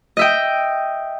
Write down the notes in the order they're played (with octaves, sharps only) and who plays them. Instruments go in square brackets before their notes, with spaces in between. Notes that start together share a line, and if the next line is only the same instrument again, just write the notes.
[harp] D#5 E5 G5